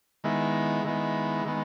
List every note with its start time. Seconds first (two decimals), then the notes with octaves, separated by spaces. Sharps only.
0.24 D#3 G#3 B3 E4
0.85 D#3 G#3 B3 E4
1.46 D#3 G#3 B3